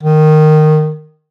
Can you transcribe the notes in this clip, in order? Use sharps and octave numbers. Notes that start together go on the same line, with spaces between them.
D#3